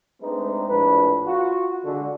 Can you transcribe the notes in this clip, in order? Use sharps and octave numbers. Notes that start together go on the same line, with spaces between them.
G#3 A3 C4 D4 D#4 B4
A#1 A2 D4 B4
F4 F#4
D3 G#3 F#4